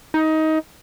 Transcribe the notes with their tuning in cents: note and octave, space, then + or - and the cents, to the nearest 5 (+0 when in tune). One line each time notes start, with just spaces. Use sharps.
D#4 +20